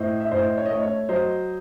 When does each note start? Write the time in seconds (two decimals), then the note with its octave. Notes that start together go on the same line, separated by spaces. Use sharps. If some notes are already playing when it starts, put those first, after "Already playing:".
Already playing: A2 C5 D#5
0.20 E5
0.31 A2 C5 D#5
0.57 C#5
0.66 D#5
0.71 A3 C#5
0.83 C#5
1.09 F#3 C5 D#5